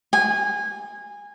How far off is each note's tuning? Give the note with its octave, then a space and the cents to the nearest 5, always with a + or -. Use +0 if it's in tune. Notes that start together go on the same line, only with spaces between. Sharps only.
G#5 -20